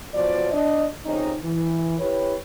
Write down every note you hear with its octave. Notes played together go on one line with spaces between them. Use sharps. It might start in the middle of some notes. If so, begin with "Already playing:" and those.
B2 F3 F#3 F#4 D5
D4 D5 D#5
F2 G#2 C3 C#4 D#4
E3
E4 G4 B4 C#5